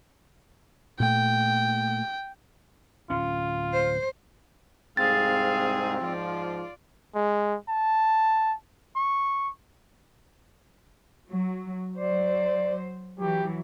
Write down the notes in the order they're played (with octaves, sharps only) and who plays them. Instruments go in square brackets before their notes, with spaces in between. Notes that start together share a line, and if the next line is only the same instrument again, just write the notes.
[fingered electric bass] A#2 A3 [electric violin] G5
[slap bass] D1 C#4 [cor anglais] F4
[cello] C5
[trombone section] C2 G#2 [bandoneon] C4 [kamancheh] G#4 F5 [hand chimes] A6
[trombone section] G#2 F3 [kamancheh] F4 D5
[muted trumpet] G#3
A5
C#6
[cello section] F#3
[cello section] F#3 C5 [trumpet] D5
[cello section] E3 F#3 [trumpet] G4